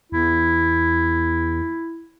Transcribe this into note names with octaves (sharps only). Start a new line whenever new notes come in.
E2 E4